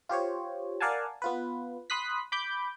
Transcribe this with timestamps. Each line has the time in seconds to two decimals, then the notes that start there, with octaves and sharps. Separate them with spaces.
0.09 F4 G4 C5 C#5
0.80 A#4 D5 F5 F#5 G#5 A5
1.22 B3 F4 B4
1.90 B5 C6 D#6 F#6 B6
2.32 B5 D6 G6